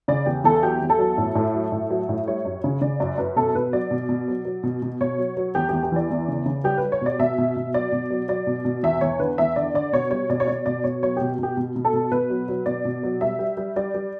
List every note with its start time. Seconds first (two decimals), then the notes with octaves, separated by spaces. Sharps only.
0.08 C#3 D5
0.26 E2 G4
0.44 E2 A4
0.63 F#3 G4
0.82 E2
0.90 A4
0.99 F#3
1.18 A2
1.35 A2
1.55 F#3
1.72 A2
1.90 F#3
2.09 A2
2.28 G3 C#5
2.45 F#2
2.64 C#3
2.81 C#3 D5
3.00 F#2 D5
3.18 F#2 B4
3.36 B2 A4
3.55 B2 B4
3.73 F#3 D5
3.91 B2
4.09 B2
4.28 F#3
4.45 F#3
4.63 B2
4.82 B2
5.00 B2 C#5
5.18 F#3
5.37 F#3
5.55 E2 G4
5.69 E2 G4
5.83 G4
5.92 E3 D5
6.10 E2
6.28 C#3
6.46 C#3
6.64 G3 G4
6.78 B4
6.83 G3
6.92 C#5
7.01 B2 D5
7.19 B2 E5
7.38 B2
7.56 B2
7.74 F#3 D5
7.92 B2
8.10 F#3
8.28 F#3 D5
8.47 B2
8.65 B2
8.83 E2 E5
9.01 E2 C#5
9.19 D3 B4
9.38 E2 E5
9.56 D3 D5
9.74 D3 D5
9.93 B2 C#5
10.11 G3 C#5
10.29 B2 D5
10.40 C#5
10.47 B2 D5
10.66 B2 D5
10.84 B2 C#5
11.03 F#3 C#5
11.17 B2 G4
11.39 B2 G4
11.57 B2
11.76 B2
11.85 A4
11.93 B2
12.11 B2 B4
12.30 F#3
12.48 F#3
12.66 B2 D5
12.85 B2
13.03 F#3
13.21 G3 E5
13.39 G3
13.57 G3
13.76 G3 D5
13.94 G3